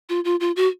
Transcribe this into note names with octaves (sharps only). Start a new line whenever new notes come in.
F4
F4
F4
F#4